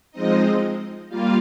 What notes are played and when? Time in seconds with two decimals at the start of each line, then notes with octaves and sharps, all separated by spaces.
0.11 F3 G#3 C4 D#4 D#5
1.08 G3 A#3 F4 F5